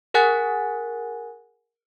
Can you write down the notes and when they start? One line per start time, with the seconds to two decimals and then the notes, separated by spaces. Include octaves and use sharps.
0.14 G#4 A#4 F#5 G#5 F#6 A6